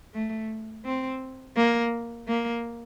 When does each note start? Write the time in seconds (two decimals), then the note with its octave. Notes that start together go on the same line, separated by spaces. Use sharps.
0.14 A3
0.85 C4
1.57 A#3
2.28 A#3